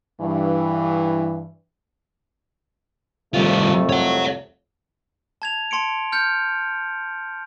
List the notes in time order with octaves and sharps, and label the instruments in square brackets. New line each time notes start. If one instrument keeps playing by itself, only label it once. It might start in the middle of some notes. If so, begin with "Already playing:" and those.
[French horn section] G2 E3
[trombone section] C2 F2 A3 [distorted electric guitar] G3 F4
[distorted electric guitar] C#5 F#5
[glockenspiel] A5 G#6 F7
A5 C6 C#7 D7
F6 G6 C#7